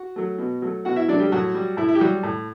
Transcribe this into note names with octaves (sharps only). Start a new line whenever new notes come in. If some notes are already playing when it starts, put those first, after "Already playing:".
Already playing: F#4 F#5
F#3 A3
B2
F#3 A3
B2 F#4 F#5
E4 E5
F#3 A3 D4 D5
G3 G4
A2 F#3 F#4
G3
A2 E4
E4
G4
F#3 G3 F#4
A2